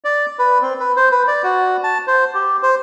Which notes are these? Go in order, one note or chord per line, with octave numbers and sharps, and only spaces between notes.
D5
B4
C4
B4
C5
B4
D5
F#4
A5
C5
G4
C5